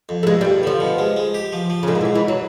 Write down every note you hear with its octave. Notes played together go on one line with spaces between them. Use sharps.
F2
A3
G2 G#3
G3
G2
D3 F3
B2
G#3
G#3
G4
F3
F3
C#3
G#2 D3
D#3
E3
G#2
E3
F#3